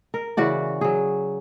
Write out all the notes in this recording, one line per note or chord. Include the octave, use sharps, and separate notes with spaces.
A#4
C#3 E3 F#4 D5
F#3 G#4